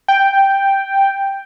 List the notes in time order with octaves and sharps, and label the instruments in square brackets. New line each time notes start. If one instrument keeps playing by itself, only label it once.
[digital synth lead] G5